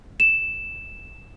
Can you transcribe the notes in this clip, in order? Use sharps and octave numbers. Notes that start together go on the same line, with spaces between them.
E7